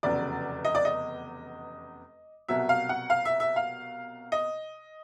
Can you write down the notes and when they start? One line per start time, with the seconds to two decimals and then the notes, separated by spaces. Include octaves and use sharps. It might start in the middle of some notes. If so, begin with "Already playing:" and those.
0.03 F1 E2 C#3 F#3 D5
0.65 D#5
0.75 D5
0.85 D#5
2.48 C2 B2 F#3 E5
2.69 F5
2.89 F#5
3.10 F5
3.25 E5
3.40 E5
3.56 F5
4.32 D#5